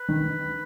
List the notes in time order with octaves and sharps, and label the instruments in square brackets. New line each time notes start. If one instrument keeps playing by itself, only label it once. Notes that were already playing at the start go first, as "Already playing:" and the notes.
Already playing: [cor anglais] B4
[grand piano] D#3